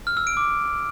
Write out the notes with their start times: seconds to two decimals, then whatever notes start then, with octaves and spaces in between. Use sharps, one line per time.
0.07 F6
0.17 E6
0.27 D7
0.37 D6